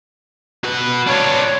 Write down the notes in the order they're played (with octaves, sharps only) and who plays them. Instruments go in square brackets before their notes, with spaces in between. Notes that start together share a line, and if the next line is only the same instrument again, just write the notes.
[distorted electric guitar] F#4 B4
[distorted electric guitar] D4 F4 [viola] C#5